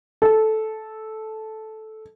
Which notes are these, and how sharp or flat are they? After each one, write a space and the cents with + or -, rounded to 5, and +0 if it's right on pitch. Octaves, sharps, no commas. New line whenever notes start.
A4 -10